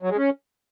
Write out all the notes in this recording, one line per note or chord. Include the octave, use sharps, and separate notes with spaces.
F#3
G#3
C#4